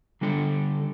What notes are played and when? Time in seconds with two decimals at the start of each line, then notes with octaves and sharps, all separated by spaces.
0.21 D3 G3 D4 A4